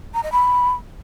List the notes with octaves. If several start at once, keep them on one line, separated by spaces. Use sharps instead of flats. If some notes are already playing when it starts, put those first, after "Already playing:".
A#5
D#5
B5